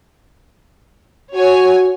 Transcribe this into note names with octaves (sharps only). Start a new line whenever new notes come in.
F#4 C#5 G#5